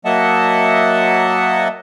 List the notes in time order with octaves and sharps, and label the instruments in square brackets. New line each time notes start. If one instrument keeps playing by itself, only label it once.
[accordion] F#3 A#3 D#5 E5 F#5 A5